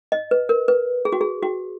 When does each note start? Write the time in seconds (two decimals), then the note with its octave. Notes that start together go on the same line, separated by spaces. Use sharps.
0.12 D#5
0.31 B4
0.49 A#4
0.68 B4
1.05 G#4
1.12 F#4
1.21 G#4
1.43 F#4